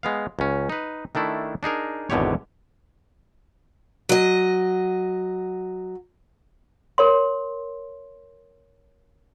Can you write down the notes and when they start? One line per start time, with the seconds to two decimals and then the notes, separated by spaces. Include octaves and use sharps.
0.03 G#3 B3 F5
0.39 C#2 C#4
0.69 D#4 B4
1.15 D#3 A3 D4 E4
1.63 D4 D#4 G#4 A#4
2.10 G#1 E2 B2 D3 G4 C#5
4.09 F#3 D#5
6.98 A#4 C#5 C6